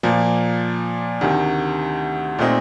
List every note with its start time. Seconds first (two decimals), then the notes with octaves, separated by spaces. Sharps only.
0.03 A#2 F3 A#3
1.21 D2 C3 D#3
2.39 A#2 A3 C4 D#4